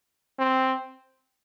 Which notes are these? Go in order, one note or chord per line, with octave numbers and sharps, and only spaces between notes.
C4